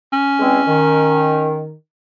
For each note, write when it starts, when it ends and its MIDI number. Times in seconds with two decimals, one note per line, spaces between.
0.13 1.66 61
0.40 0.60 40
0.40 0.60 56
0.40 0.60 60
0.68 1.72 51